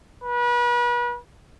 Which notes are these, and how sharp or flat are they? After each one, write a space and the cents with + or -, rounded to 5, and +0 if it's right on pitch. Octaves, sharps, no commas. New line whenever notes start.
B4 -35